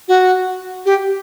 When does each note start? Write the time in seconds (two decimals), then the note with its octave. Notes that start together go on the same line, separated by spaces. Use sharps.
0.08 F#4
0.86 G4